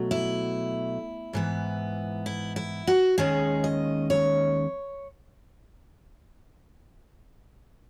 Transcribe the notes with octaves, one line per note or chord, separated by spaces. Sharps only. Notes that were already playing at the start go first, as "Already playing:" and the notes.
Already playing: B2 F#3 A3
E4
G#2 E3 B3
E4
E4
F#4
D#2 D#3 G#3 C#4 G#4
D#5
C#5